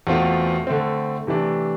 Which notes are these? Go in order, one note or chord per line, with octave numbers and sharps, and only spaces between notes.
E2 B2 A3 C4 F4
D3 A3 C4
C3 E3 A3 D4